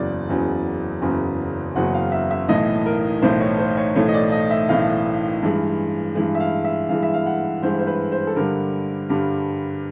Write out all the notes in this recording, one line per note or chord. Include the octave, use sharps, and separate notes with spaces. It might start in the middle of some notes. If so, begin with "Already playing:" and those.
Already playing: F#1 E2 C#3 F#3 D5
F#1 E2 C#3 F#3
F#1 E2 C#3 F#3
F#1 E2 C#3 F#3 F#5
F5
E5
E5
B1 A2 E3 A3 D#5
A#4
B1 A2 E3 A3 C5
C#5
C5
C#5
B1 A2 E3 A3 C#5
D#5
D5
D#5
E5
B1 A2 E3 A3 F5
G2 E3 G#3
G2 E3 G#3
E5
F5
E5
G2 E3 G#3 F5
E5
F5
F#5
G2 E3 G#3 C5
C5
B4
C5
A4
G2 D3 G3 A#4
G2 D3 G3